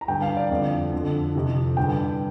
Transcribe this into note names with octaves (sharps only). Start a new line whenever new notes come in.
A#5
G2 D3 G5
F5
D5
F2 D3
F2 D3
F2 C3
G2 D3 G5